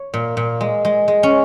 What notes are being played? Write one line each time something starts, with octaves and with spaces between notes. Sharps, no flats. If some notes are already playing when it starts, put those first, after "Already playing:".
Already playing: C#5
A#2
A#2
G#3
G#3
G#3
C#4